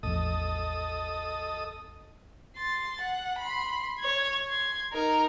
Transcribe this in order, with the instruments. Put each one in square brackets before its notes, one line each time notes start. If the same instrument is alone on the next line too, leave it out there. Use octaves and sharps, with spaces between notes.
[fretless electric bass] A1 E2 F3 [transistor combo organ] A4 D#5 D#6
[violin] C6 A6
F#5
B5 C6
C#5 G#6
C6 G#6
D#4 A#4